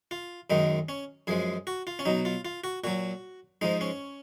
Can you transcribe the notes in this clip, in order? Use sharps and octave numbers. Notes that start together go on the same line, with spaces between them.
F4
F#2 D#3 G#3 D#4
C#4
F#2 F3 G#3 G#4
F#4
F4
C#4
B2 F#3 D#4
F4
F4
F#4
A#2 F#3 F#4
G#2 F3 G#3 D#4
C#4